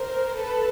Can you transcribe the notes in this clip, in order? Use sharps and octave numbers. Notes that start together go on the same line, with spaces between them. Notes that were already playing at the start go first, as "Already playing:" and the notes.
Already playing: A#4 C5
A4 B4